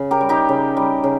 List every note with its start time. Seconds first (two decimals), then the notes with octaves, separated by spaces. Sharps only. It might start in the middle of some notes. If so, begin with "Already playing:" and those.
Already playing: C#3
0.11 G4 A#4
0.21 G3
0.29 D#4 G4
0.49 C#3
0.77 G3
1.04 C#3